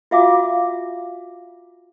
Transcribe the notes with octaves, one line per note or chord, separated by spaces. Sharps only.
F4 F#4 E5 F5 G#5 D6